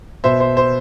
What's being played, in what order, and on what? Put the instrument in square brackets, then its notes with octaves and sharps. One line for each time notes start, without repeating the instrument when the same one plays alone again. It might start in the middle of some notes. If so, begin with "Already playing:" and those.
[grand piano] B2 C5 E5
C5
C5